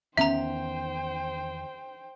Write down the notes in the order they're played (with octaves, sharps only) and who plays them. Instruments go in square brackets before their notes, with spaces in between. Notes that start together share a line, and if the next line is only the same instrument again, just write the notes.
[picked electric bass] E2 D#3 B3 [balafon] C#4 [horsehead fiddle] C5 G5 [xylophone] E5 A#5